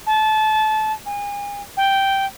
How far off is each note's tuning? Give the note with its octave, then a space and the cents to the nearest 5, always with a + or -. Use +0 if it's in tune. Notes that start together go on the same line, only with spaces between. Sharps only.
A5 -25
G#5 -35
G5 -5